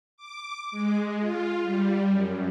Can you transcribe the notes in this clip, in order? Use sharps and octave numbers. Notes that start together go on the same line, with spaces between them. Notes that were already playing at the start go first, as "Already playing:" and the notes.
D6
G#3
F4
G3
F#2